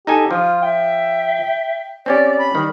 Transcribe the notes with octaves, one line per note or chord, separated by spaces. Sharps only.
D#4 G4 A4 G#5
F3 F4
E5 G5
C4 C#4 G4 D5
B5
D#3 G3